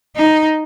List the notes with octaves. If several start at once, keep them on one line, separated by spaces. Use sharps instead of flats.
D#4